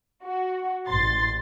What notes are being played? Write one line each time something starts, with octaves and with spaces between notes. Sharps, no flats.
F#4
A1 C6 A6